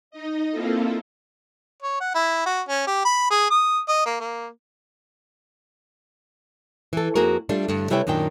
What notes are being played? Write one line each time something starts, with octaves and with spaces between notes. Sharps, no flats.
D#4 D#5
A#3 C4 E4 F4 A4
C#5
F#5
E4
F#4
C#4
G4
B5
G#4
D#6
D#5
A#3
A#3
E3 A4
F2 A#3 F#4 G#4 A#4
G3 A3 D4 F4
G2 D3
C3 G3 E4 B4 C#5 G5
F#2 A#2 D#3 D4 G5